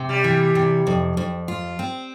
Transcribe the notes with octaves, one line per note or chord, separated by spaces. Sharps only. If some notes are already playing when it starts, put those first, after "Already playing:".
Already playing: C3
G3
E3
C3
F2
F2
F4
C4